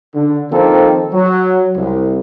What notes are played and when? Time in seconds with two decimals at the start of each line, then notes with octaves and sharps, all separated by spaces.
0.14 D3
0.51 D#3 F3 A#3 C4 A4
1.12 F#3
1.76 C2